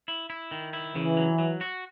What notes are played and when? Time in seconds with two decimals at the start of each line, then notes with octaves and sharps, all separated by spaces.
0.08 E4
0.30 E4
0.51 D#3
0.73 E4
0.95 C#3 E3
1.17 F#3
1.39 F#3
1.61 F#4